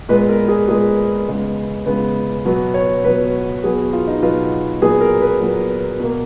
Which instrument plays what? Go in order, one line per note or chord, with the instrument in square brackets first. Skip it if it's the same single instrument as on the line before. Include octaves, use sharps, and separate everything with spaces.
[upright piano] A#2 G#3 B3 B4
A#4
G#4
A#2 G#3 B3 G#4
C#3 G#3 B3
C#3 G#3 B3
B2 F#3 B3
C#5
B2 F#3 B3 B4
B2 F#3 B3 G#4
F#4
F4
D#4
B2 F#3 B3 F4
A#2 F#3 B3 G#4
A#4
B4
A#2 F#3 B3
B2 A#3